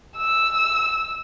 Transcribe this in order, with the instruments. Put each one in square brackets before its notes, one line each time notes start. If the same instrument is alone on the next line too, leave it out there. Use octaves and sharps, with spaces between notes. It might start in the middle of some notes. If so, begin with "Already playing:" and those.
[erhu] E6